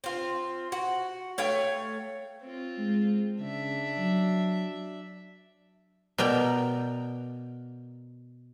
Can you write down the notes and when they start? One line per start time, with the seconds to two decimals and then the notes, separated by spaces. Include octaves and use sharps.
0.04 C4 F4
0.72 F#4
1.38 A3 C#5 F5 G5
2.42 C4 F4
2.78 G#3
3.39 C#3 D4 E5
3.98 F#3
6.18 B2 A#4 D5 G5